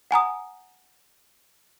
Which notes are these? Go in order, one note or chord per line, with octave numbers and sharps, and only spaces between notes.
F#5 G#5 A#5 D#6